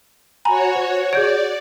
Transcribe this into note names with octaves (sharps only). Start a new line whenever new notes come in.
F#4 C#5 G#5 A#5 B5
C5
G#4 C#5 D5 G6 D7